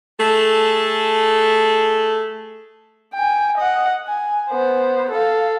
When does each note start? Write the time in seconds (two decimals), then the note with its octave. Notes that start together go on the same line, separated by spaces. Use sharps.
0.19 A3 G#4 A4
3.14 G5 G#5
3.58 D#5 F#5
4.08 G#5
4.50 B3 C5
5.11 A4 F5